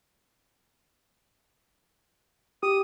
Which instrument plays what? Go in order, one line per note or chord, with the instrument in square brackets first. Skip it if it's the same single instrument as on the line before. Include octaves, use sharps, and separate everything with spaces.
[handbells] G4 [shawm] D#6